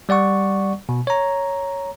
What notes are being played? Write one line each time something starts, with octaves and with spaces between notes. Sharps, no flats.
G3 D5 F#5 C#6
B2
C#5 A#5